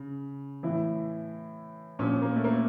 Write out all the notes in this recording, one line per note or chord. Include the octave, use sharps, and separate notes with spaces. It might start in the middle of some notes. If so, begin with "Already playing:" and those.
Already playing: C#3
A2 E3 E4
A#2 F3 C#4
A#3
A3
A#3